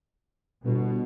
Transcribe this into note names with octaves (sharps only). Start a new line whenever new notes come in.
G1 B2